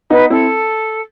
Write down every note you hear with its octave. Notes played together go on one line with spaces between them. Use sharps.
B3 D#4 B4
C4 E4 A4